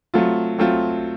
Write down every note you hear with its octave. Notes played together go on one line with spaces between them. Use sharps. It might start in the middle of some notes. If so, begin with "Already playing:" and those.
F#3 A3 C4 F4
F#3 A3 C4 F4